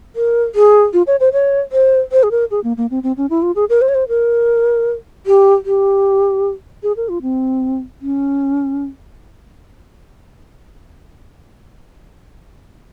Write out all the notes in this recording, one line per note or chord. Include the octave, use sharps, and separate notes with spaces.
A#4
G#4
F4
C#5
C5
C#5
C5
C5
G#4
A#4
G#4
A#3
A#3
C4
C4
C#4
E4
F4
G#4
A#4
C5
C#5
C5
A#4
G4
G4
G#4
A#4
F4
C4
C#4